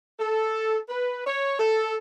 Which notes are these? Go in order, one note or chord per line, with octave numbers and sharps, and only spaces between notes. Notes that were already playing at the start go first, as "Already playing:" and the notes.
A4
B4
C#5
A4